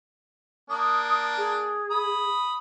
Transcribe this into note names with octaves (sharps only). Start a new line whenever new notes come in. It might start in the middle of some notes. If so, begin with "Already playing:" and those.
A#3 D4 D#6
G#4
B5 D#6